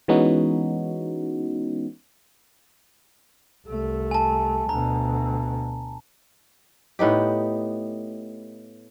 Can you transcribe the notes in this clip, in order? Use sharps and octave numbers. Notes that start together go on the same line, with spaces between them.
E3 G#3 B3 C#4 D#4 F#4
C2 A3
G#5 A5
D2 B2 A#5
A2 B3 D#4 G4